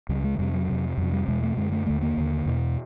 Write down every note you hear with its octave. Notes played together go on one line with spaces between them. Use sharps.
C#2 C#3 G3
G#3
F2 C3 G3
F#3
F2 C3
F2 C3 F#3
G3
E2 B2 G#3
A3
F#2 D3 G#3
A3
D#2 D3 A3
A#3
D#2 D3
E2 B2